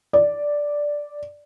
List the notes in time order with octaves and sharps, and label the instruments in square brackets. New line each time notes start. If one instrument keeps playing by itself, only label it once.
[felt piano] D5